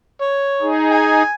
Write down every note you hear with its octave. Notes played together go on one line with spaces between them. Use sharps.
C#5
D#4 G#4
G#5